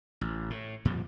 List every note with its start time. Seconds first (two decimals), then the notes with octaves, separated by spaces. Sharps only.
0.21 A1
0.50 A2
0.85 F2 A#2 F3 G3